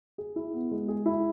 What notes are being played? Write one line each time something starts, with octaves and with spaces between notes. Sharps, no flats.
G#4
E4
B3
G#3
G#4
E4